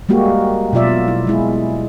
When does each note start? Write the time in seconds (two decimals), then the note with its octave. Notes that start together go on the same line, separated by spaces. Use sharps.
0.09 G3 G#3 A#3 F#4 G4
0.73 B2 F#3 F4 D5 E5
1.08 E4
1.27 G#3 E4 G#4